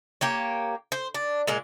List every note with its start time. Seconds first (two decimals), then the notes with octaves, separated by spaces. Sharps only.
0.21 A#3 G4 C#5
0.92 C5
1.14 D4
1.47 A#2 G#3 A#3